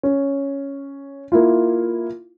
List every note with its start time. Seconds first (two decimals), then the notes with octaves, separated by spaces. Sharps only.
0.03 C#4
1.32 A#3 E4 F4